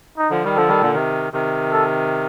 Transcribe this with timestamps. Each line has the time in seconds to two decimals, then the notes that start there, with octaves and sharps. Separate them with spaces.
0.18 D#4
0.30 D3 F3
0.44 D#3 G3
0.56 D3 F3 A4
0.68 D#3 G3
0.81 A#2 D3
0.94 C3 D#3
1.33 C3 D#3
1.72 A4